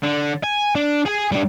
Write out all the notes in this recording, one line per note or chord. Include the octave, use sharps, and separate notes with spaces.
D3
G#5
D4
G#4 G#5
G3 D4